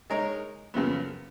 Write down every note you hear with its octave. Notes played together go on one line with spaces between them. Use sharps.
G#3 D#4 A#4 C#5
F#2 C#3 F3 B3